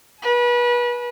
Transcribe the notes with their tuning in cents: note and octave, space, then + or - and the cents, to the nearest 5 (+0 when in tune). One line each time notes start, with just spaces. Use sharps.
B4 -30 G#5 +40